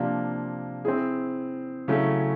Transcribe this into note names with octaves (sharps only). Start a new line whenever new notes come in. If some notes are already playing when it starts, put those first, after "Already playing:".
Already playing: C3 F3 A#3 D4
C4 E4 G#4
C#3 F#3 A3 C#4 E4